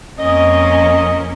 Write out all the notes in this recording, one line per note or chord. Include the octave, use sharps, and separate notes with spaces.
F2 A#3 C#4 D#5